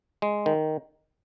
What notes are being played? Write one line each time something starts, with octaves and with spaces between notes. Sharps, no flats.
G#3
D#3